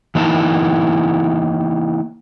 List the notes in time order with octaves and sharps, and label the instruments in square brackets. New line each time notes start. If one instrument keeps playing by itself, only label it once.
[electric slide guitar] E3 A#3 D#4 E4 A5